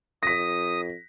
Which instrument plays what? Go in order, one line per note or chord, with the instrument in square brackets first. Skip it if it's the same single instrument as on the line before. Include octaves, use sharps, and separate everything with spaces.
[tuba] F2 [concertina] D#6 [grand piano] A#6 B6